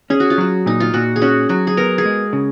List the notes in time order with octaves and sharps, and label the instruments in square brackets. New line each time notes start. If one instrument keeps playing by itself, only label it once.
[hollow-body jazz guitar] C#4 [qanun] G#4
[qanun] F#4
F4
[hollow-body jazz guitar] F#3 [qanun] F#4
[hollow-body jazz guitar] A#2 [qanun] D#4
[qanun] F4
[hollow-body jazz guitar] A#2 [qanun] F#4
[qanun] G#4
[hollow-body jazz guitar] C#4 [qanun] F#4
[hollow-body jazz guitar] F#3 [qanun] F#4
[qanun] G#4
[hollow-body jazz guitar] B3 [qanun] A#4
[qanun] G#4
[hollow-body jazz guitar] G#3
C#3